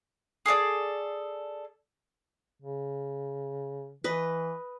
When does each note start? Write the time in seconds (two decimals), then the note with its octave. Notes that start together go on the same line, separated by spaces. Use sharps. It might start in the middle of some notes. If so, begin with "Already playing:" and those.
0.46 G#4 A4 C#5 D5
2.62 C#3
4.04 E3 B4 D#5